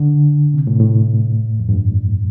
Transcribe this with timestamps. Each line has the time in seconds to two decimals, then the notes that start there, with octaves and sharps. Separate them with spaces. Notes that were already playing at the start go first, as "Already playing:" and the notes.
Already playing: D3
0.54 C3
0.67 A2
0.79 A2
1.60 F2
1.69 G2